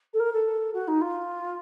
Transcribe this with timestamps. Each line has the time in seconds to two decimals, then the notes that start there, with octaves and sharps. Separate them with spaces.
0.14 A4
0.20 A#4
0.33 A4
0.74 F#4
0.88 D#4
1.01 F4